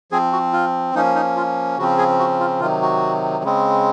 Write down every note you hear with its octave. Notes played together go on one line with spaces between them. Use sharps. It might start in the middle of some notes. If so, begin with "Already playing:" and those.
F3 C4 G#4
F#4
F4
F3 A#3 C#4 D#4
D#4
F4
C#3 F3 C4 F#4
G#4
F#4
F4
C3 D#3 F#3 F4
F#4
C#3 G#3 C4